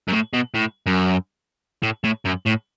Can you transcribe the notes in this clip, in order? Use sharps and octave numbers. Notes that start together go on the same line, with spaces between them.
F#2
A2
B2
A2
F#2
A2
A2
F#2
A2